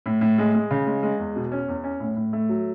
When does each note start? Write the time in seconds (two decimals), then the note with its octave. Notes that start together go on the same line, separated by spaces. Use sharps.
0.06 A2
0.21 A2
0.38 G#3
0.54 G#3
0.71 C#3
0.86 G#3
1.03 G#3
1.19 E2
1.36 B2
1.52 C#4
1.68 E2
1.84 C#4
2.00 A2
2.16 A2
2.33 A3
2.49 F#3